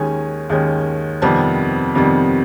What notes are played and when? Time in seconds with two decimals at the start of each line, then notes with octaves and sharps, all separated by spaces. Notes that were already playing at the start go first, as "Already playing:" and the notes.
Already playing: D#2 D#3 G#3 C#4 G#5
0.50 D#2 D#3 G#3 C#4
1.22 F2 C3 D#3 G3 B3 A5
1.95 F2 C3 D#3 G3 B3